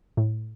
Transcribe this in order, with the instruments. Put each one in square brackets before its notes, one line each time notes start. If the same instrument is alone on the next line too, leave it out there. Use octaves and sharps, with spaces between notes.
[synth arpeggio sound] A2